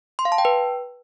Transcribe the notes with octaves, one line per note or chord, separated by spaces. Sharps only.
C6
F5
A5
G5
B4